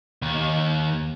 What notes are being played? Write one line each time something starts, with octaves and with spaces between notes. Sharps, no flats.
D#2